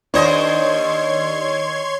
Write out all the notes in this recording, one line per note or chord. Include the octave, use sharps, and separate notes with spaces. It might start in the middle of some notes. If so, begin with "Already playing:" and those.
D#2 D4 C5 C#5 D#5 C6 G#6